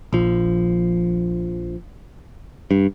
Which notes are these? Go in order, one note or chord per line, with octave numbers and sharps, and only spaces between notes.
A#1 F3
G2